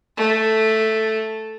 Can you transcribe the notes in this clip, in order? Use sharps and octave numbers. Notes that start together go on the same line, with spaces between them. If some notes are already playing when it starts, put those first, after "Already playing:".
A3